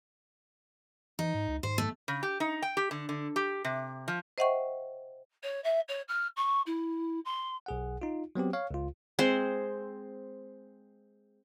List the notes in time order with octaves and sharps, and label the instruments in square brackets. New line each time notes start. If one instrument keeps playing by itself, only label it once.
[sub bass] E3 [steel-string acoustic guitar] D#4
[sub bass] G#2
C#2
[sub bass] G#2 [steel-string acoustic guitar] C5
[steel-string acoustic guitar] A3
[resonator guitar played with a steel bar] C#3
G4
D#4
G5
G4
D3
D3
G4
C3
F3
[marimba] C5 D#5 E5 F#5 G5 C#6
[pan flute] C#5
E5
C#5
F6
C#6
E4
C6
[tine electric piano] B1 G#4 F#5
D#4 F4
F#3 B3 C4 G4
C#5 F5
C#2 F4
[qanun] G#3 C4 C5